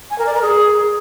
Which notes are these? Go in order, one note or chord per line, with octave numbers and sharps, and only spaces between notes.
G#5
A#4
D5
A#4
G#4